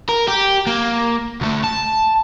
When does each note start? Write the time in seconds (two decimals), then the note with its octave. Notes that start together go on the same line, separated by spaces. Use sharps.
0.09 A#4
0.28 G4
0.67 A#3
1.41 D2 A3
1.64 A5